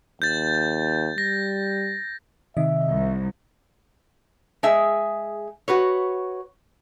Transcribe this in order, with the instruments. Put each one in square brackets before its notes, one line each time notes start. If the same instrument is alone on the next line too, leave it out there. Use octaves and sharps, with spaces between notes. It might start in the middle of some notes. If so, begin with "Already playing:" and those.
[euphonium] D#2 [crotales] G6 A6
[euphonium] G3 [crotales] A#6
[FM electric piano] C3 D#3 D#5 [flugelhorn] E5
[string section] C2
[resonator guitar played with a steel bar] G#3 G#4 E5
F#4 B4 C#5